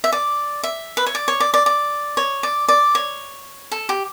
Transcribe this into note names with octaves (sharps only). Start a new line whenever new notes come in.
E5
D5
E5
B4
C#5
D5
C#5
D5
D5
D5
C#5
D5
D5
C#5
A4
G4